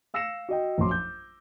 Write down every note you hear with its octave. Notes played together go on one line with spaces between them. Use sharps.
F5 E6 A#6 C7 C#7 E7
F#4 D#5 G5
A#1 F2 F#3 C6 D6
G6